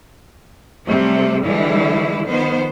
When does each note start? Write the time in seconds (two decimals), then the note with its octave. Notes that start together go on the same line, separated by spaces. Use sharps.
0.87 C3 F#3 G3 A3 C4
1.43 D3 E3 F3 G3 G#3 E4
2.28 D#3 F3 B3 C5